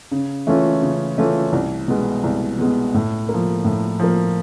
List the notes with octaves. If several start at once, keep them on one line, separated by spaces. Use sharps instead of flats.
C#3
E3 A3 C#4 F4
C#3
E3 A3 C#4 F4
C2
B2 G#3 B3
C2
B2 G#3 B3
A2
A#3
F3
A2
F3 A#3